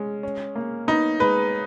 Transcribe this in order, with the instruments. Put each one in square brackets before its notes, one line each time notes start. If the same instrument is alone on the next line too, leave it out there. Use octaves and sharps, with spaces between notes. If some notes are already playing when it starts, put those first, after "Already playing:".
Already playing: [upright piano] G#3 C#4
C#4
A#3
[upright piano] B3 [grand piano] D#4
[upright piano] G#3 [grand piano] B4